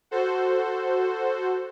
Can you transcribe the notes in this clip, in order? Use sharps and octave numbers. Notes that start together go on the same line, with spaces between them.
F#4 A4 C5